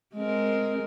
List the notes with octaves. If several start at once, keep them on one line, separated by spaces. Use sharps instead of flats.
G#3 C4 A#4